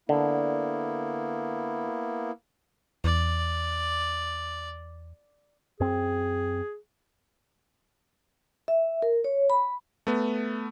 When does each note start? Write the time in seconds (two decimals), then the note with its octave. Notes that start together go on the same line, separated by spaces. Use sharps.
0.09 D3 A#3 B3 E4
3.04 E2 D5
5.80 F#2 C4 G#4
8.68 E5
9.02 A#4
9.24 C#5
9.50 B5
10.07 A3 B3